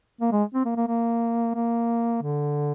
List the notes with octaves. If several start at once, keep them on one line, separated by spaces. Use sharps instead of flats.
A#3
G#3
C4
A#3
A#3
A#3
A#3
D3